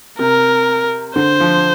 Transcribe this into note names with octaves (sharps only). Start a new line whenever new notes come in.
C3 A#4
D3 C5
F3